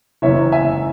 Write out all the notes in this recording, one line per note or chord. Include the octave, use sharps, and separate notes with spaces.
F#1 F#2 E3 C#5 E5
E5 G#5